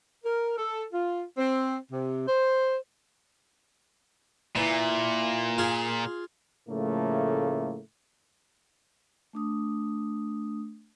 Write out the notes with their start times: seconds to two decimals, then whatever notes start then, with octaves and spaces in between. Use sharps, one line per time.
0.24 A#4
0.57 A4
0.93 F4
1.38 C4
1.91 C3
2.28 C5
4.56 A#2 E3
5.58 F4 G#4
6.69 A2 C#3 F3 A3 A#3
9.33 A3 D4 D#6